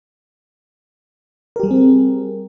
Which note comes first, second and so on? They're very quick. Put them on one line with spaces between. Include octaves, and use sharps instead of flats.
A#4 G4 G3 G#4 C4